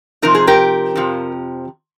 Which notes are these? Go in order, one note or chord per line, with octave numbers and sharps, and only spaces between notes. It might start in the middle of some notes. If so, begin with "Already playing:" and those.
C3 F3 C4 D#4 A#4
G#4
G4 A#4
F2 C3 F3